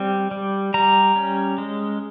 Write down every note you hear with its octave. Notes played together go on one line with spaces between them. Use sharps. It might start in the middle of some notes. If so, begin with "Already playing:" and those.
Already playing: G3 C4
G3
G3 A#5
C#4
G#3